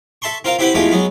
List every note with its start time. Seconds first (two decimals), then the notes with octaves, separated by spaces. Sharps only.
0.22 A4 E5 A5 C6 C#6
0.45 C4 F4 A#4 F5
0.59 C4 E4 G4 B4 C5 F#5
0.74 E2 G#3 A3 F4 G4 G#5
0.91 F#3 G#3 B3